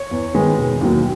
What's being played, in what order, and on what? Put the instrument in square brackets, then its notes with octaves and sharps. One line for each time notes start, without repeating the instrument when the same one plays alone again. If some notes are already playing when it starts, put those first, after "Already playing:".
Already playing: [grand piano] C#5
E2
D#3 G#3 B3
E1
D#2 D#3 F#3